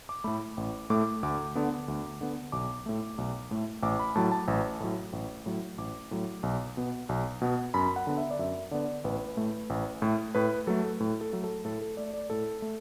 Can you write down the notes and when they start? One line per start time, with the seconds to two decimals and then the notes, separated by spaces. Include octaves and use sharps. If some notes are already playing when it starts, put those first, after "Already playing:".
0.09 D6
0.24 A2 A3 B5
0.57 A1
0.90 A2 A3 D6
1.23 D2 D6
1.55 D3 B3
1.88 D2
2.21 D3 B3
2.52 B1 D6
2.86 A2 A3
3.18 B1
3.51 A2 A3
3.83 A1 D6
3.99 B5
4.15 A2 F#3 A5
4.32 A5
4.48 A1
4.80 A2 F#3
5.13 A1
5.46 A2 F#3
5.78 A1 D6
6.11 A2 F#3
6.43 B1
6.77 B2 B3
7.09 B1
7.42 B2 B3
7.74 F#2 B5
7.96 F#5
8.07 D3 B3
8.18 E5
8.31 D5
8.39 F#2 E5
8.71 D3 B3 D5
9.04 A1 B4
9.37 A2 A3
9.70 A1
10.02 A2 A3
10.35 A2 B4
10.67 F#3 A3 A4
11.00 A2
11.21 A4
11.33 F#3 A3
11.44 A4
11.65 A2 A4
11.81 A4
11.97 A3 D5
12.14 D5
12.30 A2 A4
12.62 A3